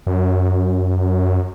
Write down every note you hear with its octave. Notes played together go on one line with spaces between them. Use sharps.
F#2